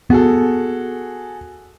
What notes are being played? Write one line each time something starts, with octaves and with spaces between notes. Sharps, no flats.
B3 F#4 G#4 A4